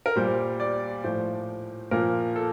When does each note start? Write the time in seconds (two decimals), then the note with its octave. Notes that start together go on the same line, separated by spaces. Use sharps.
0.06 A#4
0.16 A#2 G3 C5
0.60 D5
1.04 A2 F3 C5
1.91 A#2 F3 A#4
2.36 A4